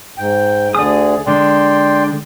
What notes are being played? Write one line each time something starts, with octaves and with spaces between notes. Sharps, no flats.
G#2 G5
D2 D3 G#4 D5 D#6
D3 G#3 D5 G5 C6